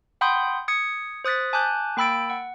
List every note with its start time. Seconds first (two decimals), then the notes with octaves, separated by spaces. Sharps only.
0.21 F#5 G5 B5 C6 D#6 G6
0.68 D#6 G#6 C#7
1.24 C5 D#6 F#6 A6 B6
1.53 G#5 A5 D6 F#6 G6
1.97 A#3 G5 B5 E6 A6 D7
2.30 F#5